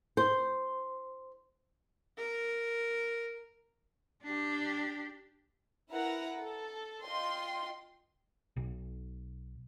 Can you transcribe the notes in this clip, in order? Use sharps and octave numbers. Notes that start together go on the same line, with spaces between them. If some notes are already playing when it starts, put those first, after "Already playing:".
C5
A#4
D4 G4
E4 A#4 B4 F#5 A#5
A4
F4 D#5 G5 C6
B1